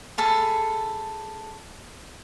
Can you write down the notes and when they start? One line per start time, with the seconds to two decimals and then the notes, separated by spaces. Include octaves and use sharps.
0.18 G#4 A4 A5 B5